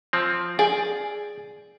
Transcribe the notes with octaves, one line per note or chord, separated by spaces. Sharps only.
F3 C4
G#4 D5